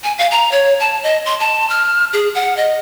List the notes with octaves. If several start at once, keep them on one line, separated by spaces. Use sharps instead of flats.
G#5
F5
A#5
C#5
A5
D#5
C6
A5
F6
G#4
F#5
D#5